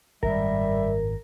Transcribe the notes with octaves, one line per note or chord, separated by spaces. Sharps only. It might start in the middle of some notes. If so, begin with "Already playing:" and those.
G#1 F#2 A2 G3 A#4 E5